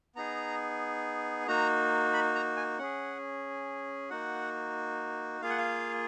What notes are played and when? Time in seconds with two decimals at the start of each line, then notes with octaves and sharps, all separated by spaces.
0.16 B3 D#4 G#4 A#5
1.47 A#3 D#4 F#4 A#5
2.13 B5
2.35 A#5
2.57 G#5
2.78 C#4 G#4 F#5
4.10 A#3 D#4 F#4 F#5
5.41 A#3 F4 G#4 F5
5.50 F#5
5.58 F5